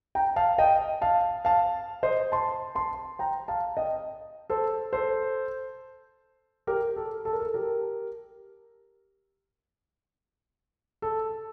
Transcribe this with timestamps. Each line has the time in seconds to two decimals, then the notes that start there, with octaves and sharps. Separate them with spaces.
0.15 G5 A#5
0.36 F5 A5
0.58 D#5 G5
1.02 F5 A5
1.45 F5 A5
2.03 C5 D#5
2.32 A5 C6
2.75 A5 C6
3.19 G5 A#5
3.48 F5 A5
3.77 D#5 G5
4.50 A4 C5
4.93 A4 C5
6.67 G4 A#4
6.96 A4
7.25 A4
7.33 A#4
7.40 A4
7.54 G4 A#4
11.02 A4